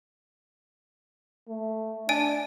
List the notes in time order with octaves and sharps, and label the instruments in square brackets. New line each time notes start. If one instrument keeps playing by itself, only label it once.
[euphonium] A3
[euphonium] D4 [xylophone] D5 G#5 D7